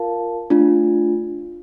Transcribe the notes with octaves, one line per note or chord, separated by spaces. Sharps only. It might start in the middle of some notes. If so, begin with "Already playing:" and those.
Already playing: F4 A#4 F5 A5
A3 D4 F4